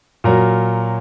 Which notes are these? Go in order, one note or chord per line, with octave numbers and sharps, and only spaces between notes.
A#2 F#3 A#4